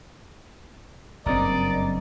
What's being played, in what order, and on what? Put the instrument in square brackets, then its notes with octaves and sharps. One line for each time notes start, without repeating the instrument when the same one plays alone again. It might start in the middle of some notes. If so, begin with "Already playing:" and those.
[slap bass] F#1 G2 C4 [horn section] A#4 D5 D#5 [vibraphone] A#5